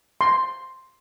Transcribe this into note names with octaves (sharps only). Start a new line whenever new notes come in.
C6